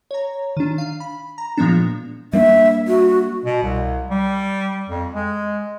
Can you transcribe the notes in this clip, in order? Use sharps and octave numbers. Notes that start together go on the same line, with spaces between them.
C#5 A#5
D#3 D4
F5
B5
A#5
A#2 F3 G#3 A#3 B3 D4
G3 A#3 D4 E5
F#4
B2
C2
G3
F2
G#3